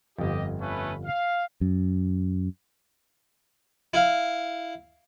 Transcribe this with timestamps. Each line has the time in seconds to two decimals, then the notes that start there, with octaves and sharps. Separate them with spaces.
0.18 G1 F2 G4 D#5
0.61 A3 C#4 B4
1.06 F5
1.61 F#2
3.94 E4 F5